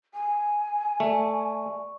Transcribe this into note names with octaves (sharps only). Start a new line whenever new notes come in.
G#5
A3 D5 C#6